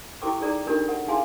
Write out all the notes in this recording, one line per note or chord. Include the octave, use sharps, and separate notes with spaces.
E4 G4 A4 G5 C#6 D6
D#4 G#4 A4 D5 A#5
D4 D#4 F4 G4 A4 A#4
A4 F#5
E4 G#4 F5 G#5 A5 C6